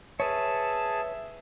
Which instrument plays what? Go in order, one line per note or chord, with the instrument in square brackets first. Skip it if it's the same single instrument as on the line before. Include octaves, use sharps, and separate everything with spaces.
[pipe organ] G#4 [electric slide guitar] B4 C#5 [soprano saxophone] E5 [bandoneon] A5